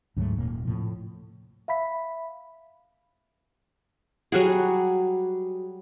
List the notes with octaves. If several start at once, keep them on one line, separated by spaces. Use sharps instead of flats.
D2 G#2 F#3 A3
D#1 A#2 A#3
A2 C3 F3
E5 F5 B5 B6
F#3 G3 F#4 G#4